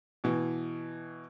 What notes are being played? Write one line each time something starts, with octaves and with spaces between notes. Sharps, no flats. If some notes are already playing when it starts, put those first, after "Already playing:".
B2 E3